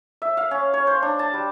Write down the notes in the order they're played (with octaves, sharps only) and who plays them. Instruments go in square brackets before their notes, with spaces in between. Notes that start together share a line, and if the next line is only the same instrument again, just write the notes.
[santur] E5
F5
C#4
C#5
C5
D4
A5
G3